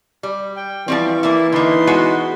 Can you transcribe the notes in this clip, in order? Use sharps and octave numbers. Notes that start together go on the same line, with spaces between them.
G3
G5
E3 F3 G3 C4 C#6
A#3 E4 D5 E5
D3 A#3 D#4 B4 C6
G#3 B3 F#4